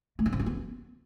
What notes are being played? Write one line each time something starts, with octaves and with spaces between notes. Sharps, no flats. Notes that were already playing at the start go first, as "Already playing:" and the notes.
A3
D4
C4
F4
B3